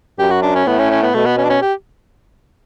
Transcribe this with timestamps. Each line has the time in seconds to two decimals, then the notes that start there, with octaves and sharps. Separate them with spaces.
0.19 F#2 G4
0.30 F#4
0.42 D4
0.55 C#4
0.66 A2 B3
0.79 C#4
0.91 C#4
1.03 B3
1.14 B2 A3
1.25 B3
1.38 C#4
1.44 D4
1.50 C#4
1.62 G4